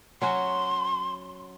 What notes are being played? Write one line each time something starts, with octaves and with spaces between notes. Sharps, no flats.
F#3 C#4 F#4 C6